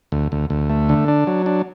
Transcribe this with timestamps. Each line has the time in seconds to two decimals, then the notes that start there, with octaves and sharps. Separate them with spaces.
0.12 D2
0.32 D2
0.50 D2
0.69 A3
0.89 D3
1.08 D4
1.27 F#3
1.46 D4